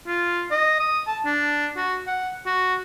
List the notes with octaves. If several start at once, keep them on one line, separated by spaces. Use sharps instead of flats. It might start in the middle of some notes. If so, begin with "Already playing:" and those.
F4
D#5
D#6
A5
D4
F#4
F#5
F#4